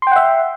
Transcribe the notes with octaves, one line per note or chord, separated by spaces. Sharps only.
E5 F#5 G5 C6